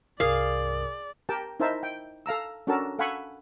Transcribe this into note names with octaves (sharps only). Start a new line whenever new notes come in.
C2 G2 G#4 A#4 D5 F5 D#6
G4 A#4 G5 A5
D#4 E4 A#4 C5 E5 A5
G5
A4 F5 A#5 E6
C#4 D4 F#4 A4 A#4 A5
A4 F5 F#5 G#5 B5 C#6